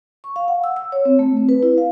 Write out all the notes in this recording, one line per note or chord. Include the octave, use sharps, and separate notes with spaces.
C#6
F5
F#5
E6
E6
C#5
C4
A3
C4
B4
E4
F5